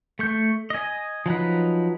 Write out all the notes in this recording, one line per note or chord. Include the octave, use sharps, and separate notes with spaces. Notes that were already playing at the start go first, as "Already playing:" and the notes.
A3 C#6 G6
D#5 G#5
F3 F#3 D#4 B4